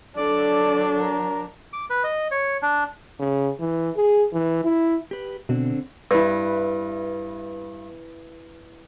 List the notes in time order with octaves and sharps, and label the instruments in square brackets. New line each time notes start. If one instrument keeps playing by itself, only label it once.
[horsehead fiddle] F#3 D4 [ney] A4 [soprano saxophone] D5
[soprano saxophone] A#4
[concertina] D6
B4
D#5
C#5
D4
[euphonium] C#3
E3
G#4
E3
E4
[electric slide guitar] G4 B4
[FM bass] B2 [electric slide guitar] D3 C4 D4
[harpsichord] G2 [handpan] E4 B4